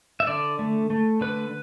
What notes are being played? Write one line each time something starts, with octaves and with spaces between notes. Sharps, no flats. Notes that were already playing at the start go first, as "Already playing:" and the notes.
E5
D3 D5
A3
A3
D3 B4